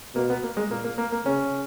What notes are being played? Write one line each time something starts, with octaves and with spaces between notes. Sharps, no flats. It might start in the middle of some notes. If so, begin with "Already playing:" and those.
B2 A#3
B3
A#3
G#3
A#2 A#3
A#3
A#3
A#3
C#3 C#4